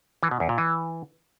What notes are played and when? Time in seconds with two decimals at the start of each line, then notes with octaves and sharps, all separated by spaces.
0.23 E3
0.31 B2
0.40 E2
0.49 A#2
0.58 E3